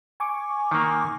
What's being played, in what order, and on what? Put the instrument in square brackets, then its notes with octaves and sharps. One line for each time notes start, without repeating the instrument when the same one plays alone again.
[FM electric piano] G#5 C#6 D6
[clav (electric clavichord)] D#3 A#3